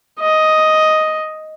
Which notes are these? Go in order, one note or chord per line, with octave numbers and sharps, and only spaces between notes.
D#5